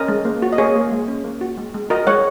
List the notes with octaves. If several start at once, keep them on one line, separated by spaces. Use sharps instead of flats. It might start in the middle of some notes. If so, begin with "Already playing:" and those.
Already playing: C#4 A#4 D#5
G#3
A#3
F#4
D#5
A#3 G#4 C#5
A#3
G#3
C#4
A#3
F#4
G#3
G#3
F#4 A#4 D#5
G#3 C#5 F#5